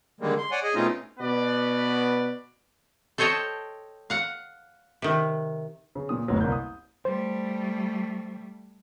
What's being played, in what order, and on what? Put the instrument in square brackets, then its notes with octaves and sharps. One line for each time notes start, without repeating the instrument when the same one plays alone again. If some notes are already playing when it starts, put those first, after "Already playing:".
[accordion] D3 D#3 G3 G#3 A#3
C6
C#5 D5 F#5 G#5
G#4 D#5 G#5
B2 A3 C4 C#4 D#4 F4
[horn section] B2 B3 B4 D5
[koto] A4 C5 C#5 D#5 G5 A5
F5 F#5
C3 D#3
[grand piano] C#3
A#2 D#6
F#1 D2 A2 F#3
C2 A#3 G6
D#6
[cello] G3 A3 [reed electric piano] C5